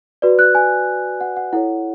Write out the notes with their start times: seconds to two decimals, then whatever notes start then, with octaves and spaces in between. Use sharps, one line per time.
0.22 F#4 B4 D5
0.39 F#6
0.55 G#5
1.21 F#5
1.37 F#5
1.53 E4 A4 C#5 F#5